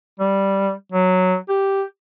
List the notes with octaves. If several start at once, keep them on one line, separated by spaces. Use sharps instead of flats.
G3
F#3
G4